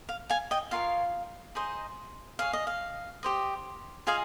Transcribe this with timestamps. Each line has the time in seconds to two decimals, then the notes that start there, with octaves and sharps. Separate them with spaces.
0.09 F5
0.30 F5 G#5
0.51 D#5 G5
0.71 F4 A#4 C#5 F5
1.55 D#4 G#4 C5 D#5
2.39 G#4 C#5 F5
2.53 D#5
2.67 F5
3.23 G4 C5 D#5
4.07 F4 G#4 D#5 F5 G#5